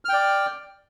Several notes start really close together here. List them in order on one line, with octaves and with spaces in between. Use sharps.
F6 G5 D5